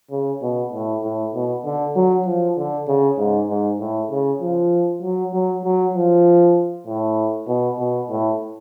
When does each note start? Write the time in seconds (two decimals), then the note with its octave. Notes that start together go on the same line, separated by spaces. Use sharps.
0.11 C#3
0.42 B2
0.73 A2
1.03 A2
1.34 B2
1.65 D3
1.96 F#3
2.26 F3
2.57 D3
2.87 C#3
3.18 G#2
3.49 G#2
3.80 A2
4.10 C#3
4.41 F3
5.02 F#3
5.33 F#3
5.64 F#3
5.95 F3
6.87 A2
7.48 B2
7.79 B2
8.10 A2